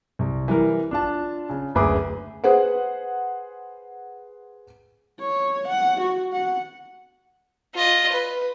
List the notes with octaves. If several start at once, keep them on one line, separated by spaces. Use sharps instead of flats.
C2
E3 G3 A#4
D4 F4 A5
C#3
F#1 D2 G#4 B4 D6
G#4 B4 C5 F#5
C#5
F#5
F#4
F#5
F4 D#5
B4